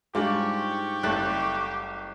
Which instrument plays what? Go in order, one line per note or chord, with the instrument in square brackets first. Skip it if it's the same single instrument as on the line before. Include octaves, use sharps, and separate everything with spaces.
[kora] G#2 [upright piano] G3 D4 F4 [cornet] G4 [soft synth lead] C#6
[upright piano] F#1 F#6 [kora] G3 A3